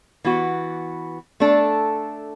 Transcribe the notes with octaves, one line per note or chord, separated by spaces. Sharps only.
E3 B3 F#4
A3 D4 A4